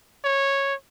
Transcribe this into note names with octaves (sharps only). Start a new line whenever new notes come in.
C#5